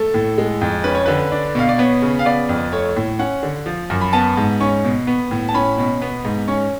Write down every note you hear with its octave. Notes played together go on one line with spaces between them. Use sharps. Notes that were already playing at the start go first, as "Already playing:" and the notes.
Already playing: A3 A4
A2
G#3
F2
C#4 B4
C#5
D3 B4
D4
B2 F5
D5
B3 C#5
C#3
F5
B3 D5
F2
A3 C#5
A2
C#4 F#5
D3
F3
F#2
B5
B3 A5
G#2
C#4 C#6
B2
B3
A2
A5
C#4 B5
B2
B3
G#2
C#4 C#6